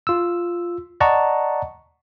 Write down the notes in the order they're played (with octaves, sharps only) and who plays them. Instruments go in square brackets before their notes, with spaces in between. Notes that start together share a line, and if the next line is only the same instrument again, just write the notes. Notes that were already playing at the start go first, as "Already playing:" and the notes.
[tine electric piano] F4 E6
D5 D#5 F#5 A5 A#5 C#6